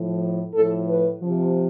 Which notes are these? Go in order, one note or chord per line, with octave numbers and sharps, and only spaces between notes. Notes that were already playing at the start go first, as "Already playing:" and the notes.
Already playing: A2 F3
A2 F3 A4
B4
C3 F3